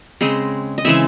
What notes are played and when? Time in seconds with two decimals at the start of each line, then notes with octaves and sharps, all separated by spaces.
0.21 C#3 G#3 C4 D#5
0.78 D#5
0.85 C#3 E3 G#3 C4 E5